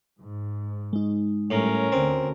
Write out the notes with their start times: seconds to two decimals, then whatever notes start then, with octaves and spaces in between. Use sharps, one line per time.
0.19 G#2
0.93 G#3 D#4
1.50 A2 G3 C#4 A#4
1.92 D2 D3 C4